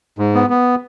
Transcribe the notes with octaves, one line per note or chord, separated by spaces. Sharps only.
G#2
B3
B3